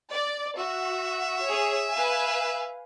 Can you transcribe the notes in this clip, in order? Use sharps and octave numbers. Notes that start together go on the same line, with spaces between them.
D5
F#4 E5
G#4 C#5
B4 F5 G#5